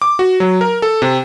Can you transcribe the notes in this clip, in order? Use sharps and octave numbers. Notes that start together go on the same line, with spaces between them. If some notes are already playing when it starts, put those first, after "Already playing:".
D6
F#4
F#3
A#4
A4
C3